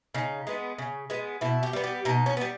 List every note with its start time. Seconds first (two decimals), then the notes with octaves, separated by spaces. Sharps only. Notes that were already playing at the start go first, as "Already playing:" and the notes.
0.14 C#3 D#4
0.47 G#3 B3
0.78 C#3
1.10 G#3 B3
1.41 B2 E4
1.63 G4
1.73 G3 B3
1.84 G4
2.05 B2 D#4
2.26 C#4
2.37 B3
2.41 G3